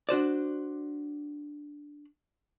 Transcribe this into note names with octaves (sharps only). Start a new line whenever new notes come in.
D4 F#4 C5 D5